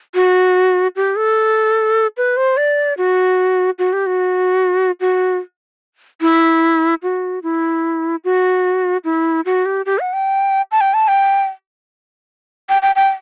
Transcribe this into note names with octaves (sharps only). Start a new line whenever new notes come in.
F#4
G4
A4
B4
C5
D5
F#4
F#4
G4
F#4
F#4
E4
F#4
E4
F#4
E4
F#4
G4
G4
F#5
G5
A5
G5
A5
G5
G5
G5
G5